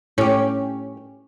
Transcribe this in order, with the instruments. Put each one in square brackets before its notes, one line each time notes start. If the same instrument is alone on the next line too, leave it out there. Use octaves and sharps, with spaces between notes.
[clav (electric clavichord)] A2 [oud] C#4 G4